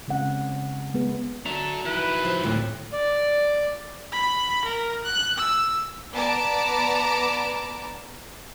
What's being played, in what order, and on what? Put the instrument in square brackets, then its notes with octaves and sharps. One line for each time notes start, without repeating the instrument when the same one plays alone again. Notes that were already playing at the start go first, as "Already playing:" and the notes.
[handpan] C#3 G#3 C4 C#4 F#5
G#3 B3 G#4 B4
[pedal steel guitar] F#3 E5 A#5 [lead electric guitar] D4 A4
[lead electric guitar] D#3 E4 [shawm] B4
[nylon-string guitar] F3
[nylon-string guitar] D2 A2 [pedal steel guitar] E3 C4
[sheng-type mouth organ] D5
[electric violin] B5
A#4
F#6
E6
[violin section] B3 D5 A5 A#5 D6 D7